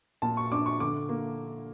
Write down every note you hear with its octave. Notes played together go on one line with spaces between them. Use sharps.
A#2 A5
C#6
D4 D6
C#6
D3 D6
A#3